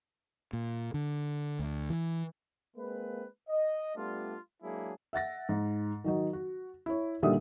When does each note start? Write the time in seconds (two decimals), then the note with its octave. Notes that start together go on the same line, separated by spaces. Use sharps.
0.53 A#2
0.94 D3
1.59 D2
1.90 E3
2.77 G#3 A#3 C4 B4
3.49 D#5
3.95 G3 A3 B3 D4 F4
4.62 F#3 G#3 A#3 D4 E4 G#4
5.13 E5 F#5 A6 A#6
5.49 G#2
6.04 D#3 F#3 D#4
6.33 F#4
6.86 E4 C#5
7.23 A#2 D3 D#3 G3 E5 D#6